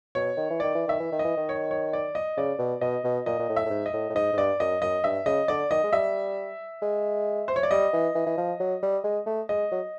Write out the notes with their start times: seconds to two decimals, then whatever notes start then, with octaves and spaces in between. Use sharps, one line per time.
0.15 B2 C#5
0.37 D#3
0.50 E3
0.60 D#3 D5
0.75 E3
0.87 D#3 E5
1.00 E3
1.12 D#3
1.19 D#5
1.25 E3
1.37 D#3
1.49 C#5
1.71 C#5
1.93 D5
2.15 D#5
2.37 C#3 D5
2.59 B2
2.81 B2 D#5
3.04 B2
3.26 A#2 D#5
3.39 A#2
3.49 A2
3.56 E5
3.66 A2
3.70 G#2
3.86 D#5
3.93 A2
4.10 A2
4.15 G#2 D#5
4.33 G#2
4.37 G2 D5
4.60 F#2 D#5
4.82 F#2 D#5
5.04 G2 E5
5.26 C#3 D#5
5.48 D3 D5
5.71 D#3 D#5
5.84 G#3
5.93 G3 E5
6.82 G#3
7.48 C5
7.56 C#5
7.63 D5
7.71 G3 D#5
7.93 E3
8.15 E3
8.26 E3
8.38 F3
8.60 F#3
8.83 G3
9.04 G#3
9.26 A3
9.49 G#3 D#5
9.72 F#3